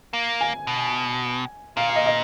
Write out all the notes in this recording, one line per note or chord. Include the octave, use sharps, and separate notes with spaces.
A#3
G#5
B2
A#2 F5
F5
D#5
D#5